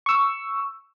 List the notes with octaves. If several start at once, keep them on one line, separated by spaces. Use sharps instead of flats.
C#6 E6